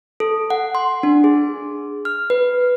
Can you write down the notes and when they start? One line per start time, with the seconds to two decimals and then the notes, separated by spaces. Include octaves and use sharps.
0.20 A4
0.50 F#5
0.75 C6
1.03 D4
1.24 G#4
2.05 F6
2.30 B4